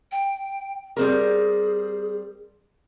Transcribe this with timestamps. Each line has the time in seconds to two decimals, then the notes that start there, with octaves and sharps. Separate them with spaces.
0.12 G5
0.97 G3 C4 G#4 A#4